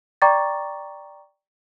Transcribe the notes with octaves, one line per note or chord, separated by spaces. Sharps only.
D5 G5 A#5 C#6 D6 A6